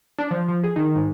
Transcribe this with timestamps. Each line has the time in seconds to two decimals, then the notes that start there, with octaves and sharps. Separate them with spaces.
0.19 D4
0.31 F3
0.48 F3
0.64 G#4
0.76 D#3
0.96 G#2